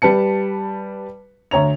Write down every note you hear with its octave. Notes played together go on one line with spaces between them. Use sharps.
G3 B4 A5 C#7
D2 C#5 A#5 F7